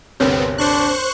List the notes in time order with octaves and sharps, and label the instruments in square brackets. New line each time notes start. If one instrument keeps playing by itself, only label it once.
[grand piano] G1 D2 C3 [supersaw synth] B3 C4 [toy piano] A#4 B4 C#5
[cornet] D4 [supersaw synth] C5 C#6 F#6